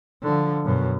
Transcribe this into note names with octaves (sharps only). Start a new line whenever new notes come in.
D3 F3
F#2 B2